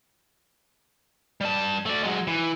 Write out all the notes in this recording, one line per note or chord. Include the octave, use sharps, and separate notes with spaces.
G3 A5
A3 D5
F#3 G#3
E3